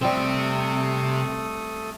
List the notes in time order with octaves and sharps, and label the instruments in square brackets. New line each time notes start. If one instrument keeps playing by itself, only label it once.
[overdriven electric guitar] C3 G5 [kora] G3 C4 [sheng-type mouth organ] A3 A4 D#6